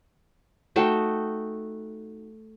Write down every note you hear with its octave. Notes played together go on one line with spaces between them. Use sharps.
A3 D#4 F#4 G5